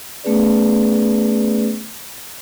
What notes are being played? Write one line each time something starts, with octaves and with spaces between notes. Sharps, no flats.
A3 B3 C#4 G#4 B4 D5